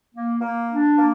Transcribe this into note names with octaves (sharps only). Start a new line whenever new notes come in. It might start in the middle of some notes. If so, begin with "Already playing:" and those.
A#3
A#3
D4
A#3